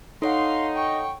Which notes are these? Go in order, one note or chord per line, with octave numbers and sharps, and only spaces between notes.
D#4 A4 C#5 F5 F#5 C6
G5 C#6